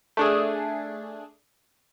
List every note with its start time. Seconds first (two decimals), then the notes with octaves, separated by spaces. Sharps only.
0.17 A3 D4 G#4